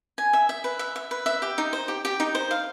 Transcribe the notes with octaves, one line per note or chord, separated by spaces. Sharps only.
G#5
E5
E5
B4
E5
E5
B4
E5
G4
D#4
C5
G4
G4
D#4
C5
F5